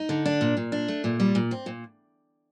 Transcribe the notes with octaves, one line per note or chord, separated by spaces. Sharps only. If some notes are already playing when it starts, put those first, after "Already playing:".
Already playing: D#4
D3
D4
A#2
A#2
D4
A3
A#2
G3
A#2
C4
A#2